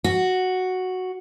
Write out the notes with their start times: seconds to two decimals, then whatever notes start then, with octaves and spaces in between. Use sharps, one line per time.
0.04 F#4